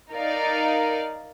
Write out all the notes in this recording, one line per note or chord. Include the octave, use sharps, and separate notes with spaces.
D#4 A#4 D5 F5